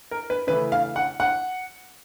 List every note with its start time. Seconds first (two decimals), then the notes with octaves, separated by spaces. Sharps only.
0.11 A#4
0.30 B4
0.47 C#3 E3 A3 B4
0.72 F5
0.96 F#5
1.20 F#5